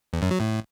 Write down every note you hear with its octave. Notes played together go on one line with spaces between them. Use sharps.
E2
F#2
F#3
A2